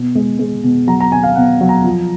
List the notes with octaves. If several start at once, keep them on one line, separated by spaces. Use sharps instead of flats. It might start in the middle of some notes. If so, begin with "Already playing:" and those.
Already playing: B2
G#3
G#3
B2
F#3 A#5
A#5
B2 G#5
F5
B2 F#5
F#3
A#5
F3